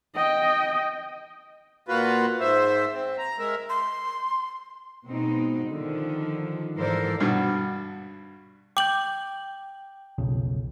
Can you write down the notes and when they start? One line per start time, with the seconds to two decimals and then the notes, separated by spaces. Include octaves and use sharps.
0.15 D#5 G5
1.88 A#2 F4 F#4 B4
2.40 G#2 C5 E5
2.94 C4
3.18 A#5
3.39 G#3 A#4 E5
3.69 C6
5.06 B2 G#3 C4 D#4
5.69 D3 D#3 F3
6.76 G#2 E3 A4 A#4 C5 D5
7.20 G2 B2 D3
8.77 G5 D6 G6 F#7
10.18 B1 F2 C#3